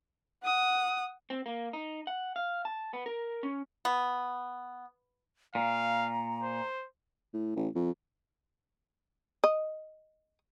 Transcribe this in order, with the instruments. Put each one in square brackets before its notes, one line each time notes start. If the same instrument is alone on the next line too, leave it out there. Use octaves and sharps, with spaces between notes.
[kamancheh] F#5 D#6
[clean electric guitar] C4
A#3
D#4
F#5
F5
A5
B3
A#4
C#4
[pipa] B3
[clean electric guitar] A#2 [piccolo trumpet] F5 [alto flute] A#5
[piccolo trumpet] C5
[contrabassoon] A2
A1
F2
[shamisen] D#5